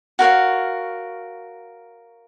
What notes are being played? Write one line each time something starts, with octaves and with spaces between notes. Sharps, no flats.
F#4 A#4 C#5 F5